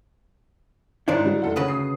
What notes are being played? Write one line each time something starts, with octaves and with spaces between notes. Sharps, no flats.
G#1 D#3 D4 E4 C5
D3 F#3 G3
F1 A4 F#5
D2 C#3 B4 D#6
D#6 C7